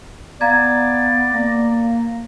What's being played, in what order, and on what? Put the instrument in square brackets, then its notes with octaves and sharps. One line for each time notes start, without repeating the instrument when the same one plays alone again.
[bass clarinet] B3 [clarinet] D5 [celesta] F5 A#5 G#6
[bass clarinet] A#3 [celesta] A#6